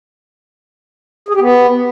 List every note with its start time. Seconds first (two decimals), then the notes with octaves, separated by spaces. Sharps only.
1.29 G#4
1.35 G4
1.41 B3